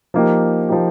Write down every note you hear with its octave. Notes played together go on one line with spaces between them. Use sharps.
F3 A#3 D#4 G4
F3 A#3 D#4 G4